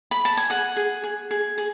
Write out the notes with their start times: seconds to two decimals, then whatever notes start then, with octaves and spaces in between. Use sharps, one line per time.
0.11 B5
0.25 A5
0.37 G#5
0.50 G#4 F#5
0.76 G#4
1.04 G#4
1.31 G#4
1.58 G#4